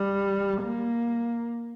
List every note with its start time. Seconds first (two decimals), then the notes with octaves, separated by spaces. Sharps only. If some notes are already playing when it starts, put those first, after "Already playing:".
Already playing: G3
0.62 A#3